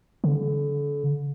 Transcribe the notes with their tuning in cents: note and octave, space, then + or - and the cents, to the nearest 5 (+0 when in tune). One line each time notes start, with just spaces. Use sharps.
D3 -35